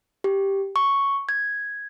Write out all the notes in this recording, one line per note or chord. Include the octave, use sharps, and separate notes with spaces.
G4
C#6
G#6